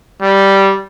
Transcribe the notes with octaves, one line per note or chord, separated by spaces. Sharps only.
G3